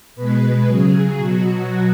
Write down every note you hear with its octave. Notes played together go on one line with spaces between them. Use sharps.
B2 G#3 B4
C#3 F#3 G#4
B2 F#3 F#4